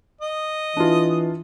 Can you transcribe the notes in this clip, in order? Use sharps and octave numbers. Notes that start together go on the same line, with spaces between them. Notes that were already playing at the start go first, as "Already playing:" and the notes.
D#5
E3 D4 F4